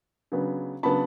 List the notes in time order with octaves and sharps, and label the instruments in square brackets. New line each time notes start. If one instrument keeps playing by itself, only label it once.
[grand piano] C#3 F#3 B3 D4
C#3 F#3 B3 D4 A5 B5